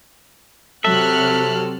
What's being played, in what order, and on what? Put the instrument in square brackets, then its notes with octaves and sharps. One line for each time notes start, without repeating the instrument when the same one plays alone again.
[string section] C3 F#3 [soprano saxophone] A4 [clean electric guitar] E5 [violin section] F6 F#6